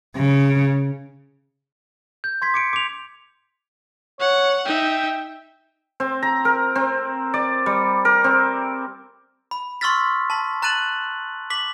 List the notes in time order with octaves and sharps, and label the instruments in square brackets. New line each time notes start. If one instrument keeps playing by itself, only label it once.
[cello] C#3
[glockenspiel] G6
C6 G#6 B6
D6 C#7 D7
D6 F7
[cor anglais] C#5 [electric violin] F#5
[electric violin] D#4 E5 [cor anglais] G5
[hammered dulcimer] C4
A#5
A#4
C4
D5
G3
A#4
C4
[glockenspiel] B5
C6 C#6 E6 F6 A6 B6
A5 C6 B6
A#5 F#6 A6 D#7 F#7
D6 B6 F#7